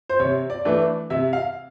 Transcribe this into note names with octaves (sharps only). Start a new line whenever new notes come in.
C5
C3 C#5
D5
E3 A3 D4
C3 E5
F5